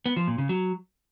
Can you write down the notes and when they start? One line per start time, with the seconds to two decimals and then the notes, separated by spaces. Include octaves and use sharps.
0.06 B3
0.16 F3
0.27 A#2
0.38 C#3
0.49 F#3